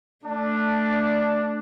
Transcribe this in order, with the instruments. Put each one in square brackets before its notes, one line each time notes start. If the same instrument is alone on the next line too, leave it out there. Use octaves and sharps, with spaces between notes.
[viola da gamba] A3 [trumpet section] D4